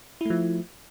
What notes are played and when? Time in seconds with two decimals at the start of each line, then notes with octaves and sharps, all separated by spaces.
0.21 E4
0.25 A3
0.30 F3